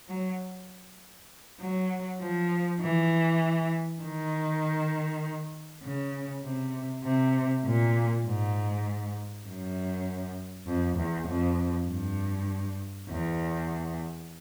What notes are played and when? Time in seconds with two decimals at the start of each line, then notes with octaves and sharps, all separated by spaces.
0.09 F#3
1.60 F#3
2.20 F3
2.81 E3
4.02 D#3
5.83 C#3
6.44 C3
7.04 C3
7.65 A#2
8.25 G#2
9.46 F#2
10.66 F2
10.97 E2
11.28 F2
11.88 G2
13.09 E2